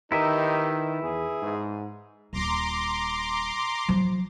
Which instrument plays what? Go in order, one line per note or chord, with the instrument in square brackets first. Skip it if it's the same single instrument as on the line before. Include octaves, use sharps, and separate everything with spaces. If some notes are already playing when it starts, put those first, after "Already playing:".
[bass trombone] D#3 [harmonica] D#4 G4 A#4 [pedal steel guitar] E4 B4 E5
[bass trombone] E2 [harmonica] G#4
[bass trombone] G#2
[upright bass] D#1 F4 [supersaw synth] A#5 C6 D6
[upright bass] F3 F#3